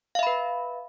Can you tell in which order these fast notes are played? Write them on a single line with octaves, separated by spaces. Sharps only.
F5 E5 B5 B4